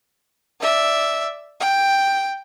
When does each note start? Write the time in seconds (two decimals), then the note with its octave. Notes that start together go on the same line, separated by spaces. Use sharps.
0.61 D5 E5
1.60 G5